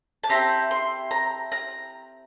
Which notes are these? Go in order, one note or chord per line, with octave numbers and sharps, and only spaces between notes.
A5
C4 E4 G4 A#5
C6
A#5
A#5